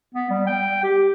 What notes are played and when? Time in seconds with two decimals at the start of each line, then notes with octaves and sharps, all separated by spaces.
0.15 B3
0.30 G3
0.47 G5
0.83 G4